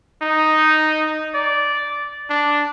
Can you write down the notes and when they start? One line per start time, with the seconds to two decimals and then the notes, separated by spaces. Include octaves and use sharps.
0.22 D#4
1.34 D5
2.30 D4